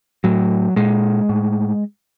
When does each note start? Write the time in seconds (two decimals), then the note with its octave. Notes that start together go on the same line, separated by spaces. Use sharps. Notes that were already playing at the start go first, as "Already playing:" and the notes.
0.24 A2 F#3
0.76 A#2 G#3
1.29 A2